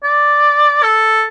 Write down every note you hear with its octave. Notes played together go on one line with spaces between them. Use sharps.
D5
A4